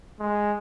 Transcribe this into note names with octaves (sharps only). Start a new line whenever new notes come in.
G#3